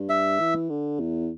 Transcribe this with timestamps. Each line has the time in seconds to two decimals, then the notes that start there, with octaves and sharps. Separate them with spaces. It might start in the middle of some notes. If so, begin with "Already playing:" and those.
Already playing: G2
0.09 E5
0.40 E3
0.70 D3
1.00 E2